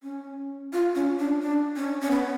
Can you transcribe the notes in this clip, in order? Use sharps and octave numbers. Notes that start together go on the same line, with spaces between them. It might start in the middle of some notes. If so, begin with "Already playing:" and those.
C#4
F4
C#4
D4
D4
C#4
C#4
B3